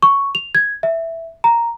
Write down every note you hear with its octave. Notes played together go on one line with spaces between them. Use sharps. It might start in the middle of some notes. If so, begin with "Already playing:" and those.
C#6
F7
G#6
E5
A#5